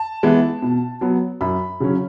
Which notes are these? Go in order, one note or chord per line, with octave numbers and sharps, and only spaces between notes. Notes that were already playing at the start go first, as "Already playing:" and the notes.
Already playing: A5
E3 G#3 B3
B2
F#3 B3
F#2 B5
C#3 F#3 C#4